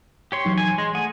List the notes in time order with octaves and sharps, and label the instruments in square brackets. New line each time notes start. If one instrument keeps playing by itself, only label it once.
[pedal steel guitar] G4 C#5 C6
[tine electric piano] E3 F#3 D#4
[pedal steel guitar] G#5
[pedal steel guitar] G#3 [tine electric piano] C6
[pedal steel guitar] A3 G#4 G#5 [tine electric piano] F#5